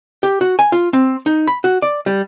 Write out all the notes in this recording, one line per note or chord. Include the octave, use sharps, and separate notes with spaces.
G4
F#4
G#5
F4
C4
D#4
B5
F#4
D5
G3